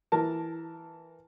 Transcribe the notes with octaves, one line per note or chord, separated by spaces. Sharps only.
E3 A#4 A5